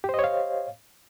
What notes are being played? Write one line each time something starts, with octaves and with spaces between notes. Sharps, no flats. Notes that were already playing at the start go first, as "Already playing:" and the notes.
G4 C5 C#5 D#5 F5